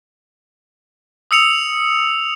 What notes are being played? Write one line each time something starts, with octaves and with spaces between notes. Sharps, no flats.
D#6 E6 C#7 F7